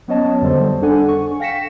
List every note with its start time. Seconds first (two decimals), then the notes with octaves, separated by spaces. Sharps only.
0.08 F#3 B3 C#4 C#5 D#5 A5
0.41 F2 D3 G3 A4 C5
0.82 D4 A4 F#5 G#5
1.08 C#6
1.40 F5 G5 A#6 B6 C#7 E7